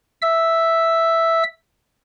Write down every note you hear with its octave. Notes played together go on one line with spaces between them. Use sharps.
E5 E6